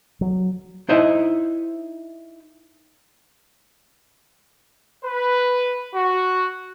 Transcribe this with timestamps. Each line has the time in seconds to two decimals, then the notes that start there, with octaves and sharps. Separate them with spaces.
0.21 F#3
0.89 D#4 E4 C5 D#5 E5
5.05 B4
5.94 F#4